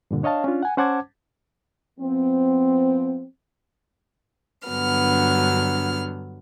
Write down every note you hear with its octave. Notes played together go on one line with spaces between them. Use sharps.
G2 A#2 D3
D4 C#5 D#5 F5 A5
C#4 D4 F4
F#5 G#5
C#4 C5 F#5 A5 D6 G#6
F3 B3 C4
G2 D3 F#3 B3 F6